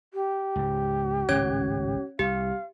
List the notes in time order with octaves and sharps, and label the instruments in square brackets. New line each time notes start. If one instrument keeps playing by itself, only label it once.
[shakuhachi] G4
[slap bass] C#2 G#2
[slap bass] G#1 C#2 A2 [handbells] C#4 C#5 G#6
[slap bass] C2 [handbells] G4 [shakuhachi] F5